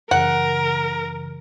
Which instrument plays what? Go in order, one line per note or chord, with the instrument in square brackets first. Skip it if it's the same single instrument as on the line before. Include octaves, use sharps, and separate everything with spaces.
[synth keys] F#2 C#3 E3 [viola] A#4 [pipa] F#5